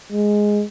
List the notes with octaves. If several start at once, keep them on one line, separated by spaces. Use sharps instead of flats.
G#3